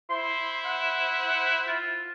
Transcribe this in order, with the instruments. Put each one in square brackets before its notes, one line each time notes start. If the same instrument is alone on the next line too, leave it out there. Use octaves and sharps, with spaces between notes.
[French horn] E4 [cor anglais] C5 [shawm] C6
[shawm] F#5
F4